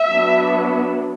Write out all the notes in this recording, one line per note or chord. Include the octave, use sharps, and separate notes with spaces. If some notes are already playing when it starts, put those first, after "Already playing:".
Already playing: E5
F#3 B3 D4